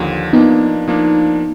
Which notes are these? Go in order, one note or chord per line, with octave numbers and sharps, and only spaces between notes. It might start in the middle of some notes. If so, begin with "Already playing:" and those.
Already playing: D#2 D3 F3
F3 A#3 B3 D4 D#4
F3 A#3 D4